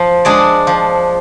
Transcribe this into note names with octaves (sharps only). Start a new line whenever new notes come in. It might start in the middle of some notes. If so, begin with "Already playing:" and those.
Already playing: F3
G#3 D4 G#4 D5
F3